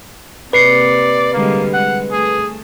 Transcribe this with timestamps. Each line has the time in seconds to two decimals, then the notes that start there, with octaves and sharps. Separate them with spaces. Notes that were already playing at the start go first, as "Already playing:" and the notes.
0.53 C3 A#3 B4 D5 C7 C#7
1.33 D3 G3 G#3 A#3
1.73 G#3 F#5
2.12 A3 G#4